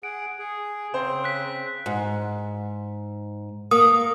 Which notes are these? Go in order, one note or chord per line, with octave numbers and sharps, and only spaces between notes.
G#4 F#5 D7
G#4
C#3 C4 C5
F#6 B6
G#2
A#3 D#6